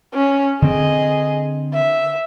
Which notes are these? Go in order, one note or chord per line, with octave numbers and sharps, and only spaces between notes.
C#4
D3 C4 G#4 D#5
E5